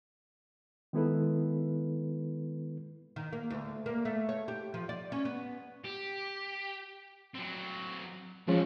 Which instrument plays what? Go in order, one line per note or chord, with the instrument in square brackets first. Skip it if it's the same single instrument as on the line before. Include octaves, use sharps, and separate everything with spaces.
[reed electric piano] D#3 G#3 B3 E4 A4 B4
[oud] D#3
A#3
D2
A#3
A3
C#5
G4
F3
D5
C#4
B3
[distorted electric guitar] G4
F#3 C4
[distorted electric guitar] F2 F#4 [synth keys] F3 G#3 C#4